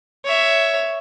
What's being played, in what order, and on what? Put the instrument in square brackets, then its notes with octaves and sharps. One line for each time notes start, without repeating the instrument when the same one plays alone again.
[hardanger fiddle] C#5 E5